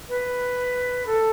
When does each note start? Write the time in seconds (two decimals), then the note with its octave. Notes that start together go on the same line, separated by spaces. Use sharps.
0.09 B4
1.06 A4